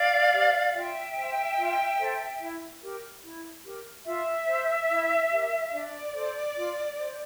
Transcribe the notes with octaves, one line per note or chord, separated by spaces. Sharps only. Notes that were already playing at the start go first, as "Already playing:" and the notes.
Already playing: D5 F5
G4 C5
F4 E5 G5
C5
F4
A4 C5
E4
G4 A#4
E4
G4 A#4
F4 E5
C5
E4
G4 A#4
D4 D5
A4 C5
F4
C5